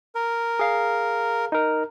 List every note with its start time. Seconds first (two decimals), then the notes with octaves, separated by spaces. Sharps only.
0.15 A#4
0.59 G#4 F5
1.52 D#4 A#4